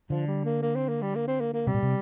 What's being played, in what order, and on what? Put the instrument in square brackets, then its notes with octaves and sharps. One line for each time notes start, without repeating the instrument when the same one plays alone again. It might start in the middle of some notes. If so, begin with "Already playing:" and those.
[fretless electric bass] D3 [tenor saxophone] F3
[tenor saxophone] G3
A#3
A#3
C4
A#3
G3
A#3
C4
A#3
A#3
[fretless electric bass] C3 [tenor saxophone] G3
[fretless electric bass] A#2
C3